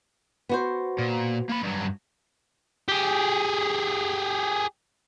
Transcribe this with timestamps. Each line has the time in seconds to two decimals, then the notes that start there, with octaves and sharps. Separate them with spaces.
0.49 B3 F#4 C5
0.99 A#2
1.50 A#3 B5
1.63 G2 F#3
2.88 G4 G#4